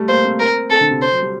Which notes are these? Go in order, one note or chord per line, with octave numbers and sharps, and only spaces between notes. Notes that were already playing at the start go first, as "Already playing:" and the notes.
Already playing: G3 A3
A#3 C5
C4
A#4
C4 A4
D3
C3
C5
F#3
G3